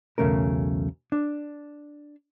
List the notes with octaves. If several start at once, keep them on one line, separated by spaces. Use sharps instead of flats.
B1 E2 C#3 A3 C#4 A#4
D4